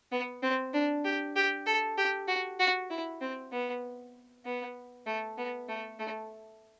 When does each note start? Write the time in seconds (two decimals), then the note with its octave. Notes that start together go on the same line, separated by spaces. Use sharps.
0.12 B3
0.43 C4
0.74 D4
1.05 G4
1.36 G4
1.66 A4
1.97 G4
2.28 F#4
2.59 F#4
2.90 E4
3.21 C4
3.52 B3
4.45 B3
5.06 A3
5.37 B3
5.69 A3
5.99 A3